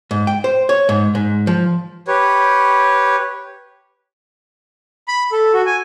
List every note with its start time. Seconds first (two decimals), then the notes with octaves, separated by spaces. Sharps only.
0.11 G#2
0.27 G5
0.44 C5
0.69 C#5
0.89 G#2
1.15 G#2
1.47 F3
2.07 G4 B4 C#5
5.08 B5
5.32 A4
5.54 F#4
5.66 G#5